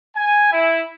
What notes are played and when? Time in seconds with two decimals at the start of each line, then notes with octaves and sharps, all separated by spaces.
0.16 G#5
0.52 E4